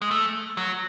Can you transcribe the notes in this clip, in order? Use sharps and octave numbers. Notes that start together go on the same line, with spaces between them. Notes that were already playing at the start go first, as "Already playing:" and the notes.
G#3
A3
F#3